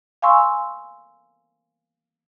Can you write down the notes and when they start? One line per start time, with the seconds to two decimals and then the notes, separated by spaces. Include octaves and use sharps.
0.22 F5 G#5 C6 C#6 E6